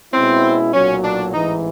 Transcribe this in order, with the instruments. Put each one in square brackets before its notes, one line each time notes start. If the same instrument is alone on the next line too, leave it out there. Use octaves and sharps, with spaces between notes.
[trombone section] B2 G#3 C#4 E4 [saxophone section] C4
[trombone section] B1 A#2 F#3 [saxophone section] C#4
[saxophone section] D4
[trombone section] A1 G#2 E3 [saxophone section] D#4